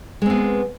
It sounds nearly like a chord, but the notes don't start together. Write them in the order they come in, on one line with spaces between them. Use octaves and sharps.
G#3 C4 B3